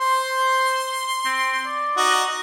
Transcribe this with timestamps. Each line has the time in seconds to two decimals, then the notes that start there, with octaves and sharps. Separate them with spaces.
0.01 C5 C6
1.26 C4
1.66 D5
1.97 D#4 F#4 D#5